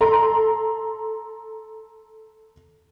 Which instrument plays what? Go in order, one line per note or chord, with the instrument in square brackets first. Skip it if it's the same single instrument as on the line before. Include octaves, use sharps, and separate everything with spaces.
[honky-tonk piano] A4 A#5 C6